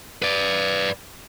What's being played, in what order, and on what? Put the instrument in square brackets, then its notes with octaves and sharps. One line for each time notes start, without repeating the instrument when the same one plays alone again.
[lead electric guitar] B4 D5